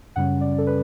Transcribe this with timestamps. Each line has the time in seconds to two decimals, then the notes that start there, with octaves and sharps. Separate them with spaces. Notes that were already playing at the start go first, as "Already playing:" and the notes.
0.16 F#2 C#3 G3 C#4 F#5
0.41 D5
0.58 A4
0.67 B4